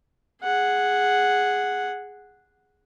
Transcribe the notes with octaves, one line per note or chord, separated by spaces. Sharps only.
G#4 F#5